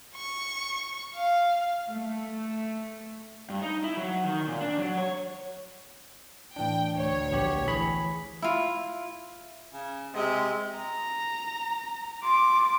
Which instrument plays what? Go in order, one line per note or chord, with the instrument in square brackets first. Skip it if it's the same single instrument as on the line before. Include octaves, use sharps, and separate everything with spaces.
[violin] C#6
F5
[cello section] A3
[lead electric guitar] G2
D#4
E4
F#3
D#3
A#2
D4
F#3
C#5
[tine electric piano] A2 E3 D4 [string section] G5
[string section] D2 C#5
[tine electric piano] A#1 B3 G4
E3 G#4 B5
[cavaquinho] E4 F4
[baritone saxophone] C#3
[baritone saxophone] C3 [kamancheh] G#3
[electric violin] A#5
[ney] C6 [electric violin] D6